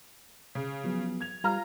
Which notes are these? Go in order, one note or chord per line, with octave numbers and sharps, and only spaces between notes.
C#3
F3 F#3 B3
G#6 F7
G3 F4 A#5 F6